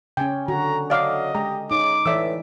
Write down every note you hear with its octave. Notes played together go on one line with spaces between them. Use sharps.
C#3 C#4 G5 G#5
D3 F#4 A#5
F#3 D5 D#5 F5 D6
G#3 G4 A#5
C#3 D#4 D6
A2 E3 D5 E5 E6